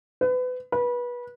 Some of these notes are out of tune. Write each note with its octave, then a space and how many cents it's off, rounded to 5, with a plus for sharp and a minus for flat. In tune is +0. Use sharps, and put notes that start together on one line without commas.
B4 +30
B4 -25